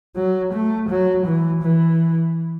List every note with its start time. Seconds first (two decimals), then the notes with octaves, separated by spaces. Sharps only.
0.16 F#3
0.53 A3
0.89 F#3
1.26 E3
1.63 E3